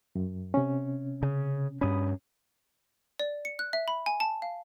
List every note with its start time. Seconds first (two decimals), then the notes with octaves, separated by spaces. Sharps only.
0.15 F#2
0.54 C3 C#4
1.23 C#3
1.81 G2 C#4 B5 D#6
3.20 D5
3.45 C#7
3.59 F#6
3.73 E5
3.88 B5
4.06 G#5
4.20 A5
4.42 F5